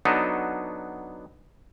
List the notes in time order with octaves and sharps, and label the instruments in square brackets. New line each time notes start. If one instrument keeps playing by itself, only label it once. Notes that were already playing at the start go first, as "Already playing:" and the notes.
[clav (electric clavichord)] F#3 B3 D4 D#4 A4